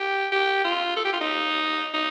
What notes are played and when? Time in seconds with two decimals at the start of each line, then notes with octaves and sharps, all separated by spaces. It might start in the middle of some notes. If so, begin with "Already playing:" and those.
Already playing: G4
0.32 G4
0.64 F4
0.96 A4
1.05 G4
1.13 F4
1.21 D#4
1.94 D#4